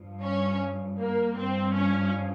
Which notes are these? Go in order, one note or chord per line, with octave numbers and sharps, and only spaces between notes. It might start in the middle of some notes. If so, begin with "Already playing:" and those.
Already playing: G2 F3
C#4
A#3
G2 F3 C4
C#4